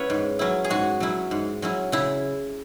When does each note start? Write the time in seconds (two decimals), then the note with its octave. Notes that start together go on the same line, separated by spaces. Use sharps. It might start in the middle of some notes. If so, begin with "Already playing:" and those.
Already playing: C#4 E4 B4 C#5 F#5
0.10 G#2
0.39 F#3 C#4 E4
0.64 G#4
0.70 G#2 F#4
1.00 F#3 C#4 E4
1.31 G#2
1.62 F#3 C#4 E4
1.92 C#3 E4